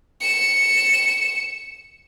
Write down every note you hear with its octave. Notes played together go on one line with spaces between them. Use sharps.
C#7 E7